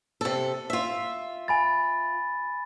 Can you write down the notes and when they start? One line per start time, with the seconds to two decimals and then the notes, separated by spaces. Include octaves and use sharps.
0.21 C3 A4
0.70 F4 E5
1.48 G#5 B5 A6